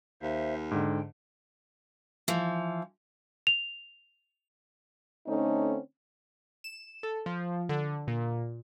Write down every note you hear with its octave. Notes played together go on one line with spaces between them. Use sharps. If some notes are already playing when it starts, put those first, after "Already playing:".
D#2 C5 E5 F5
G#2 D3 G5
E3 F3
F7
D3 A3 C4 C#4 D#4
E7
A4
F3
D3
A#2